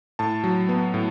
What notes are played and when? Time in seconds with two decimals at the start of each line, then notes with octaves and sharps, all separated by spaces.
0.19 A2 A5
0.44 F#3
0.69 B3
0.94 A2